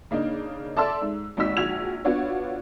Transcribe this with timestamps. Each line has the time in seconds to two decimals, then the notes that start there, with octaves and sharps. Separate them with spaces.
0.11 C#3 A#3 D4 D#4
0.77 A4 D5 E5 A5 C6 E6
1.01 G#2
1.37 G#1 D#2 D#4 F#4 E6 B6
1.57 A#1 G#2 F#4 E6 G#6 F7
2.05 B3 D4 F4 F#4 C#5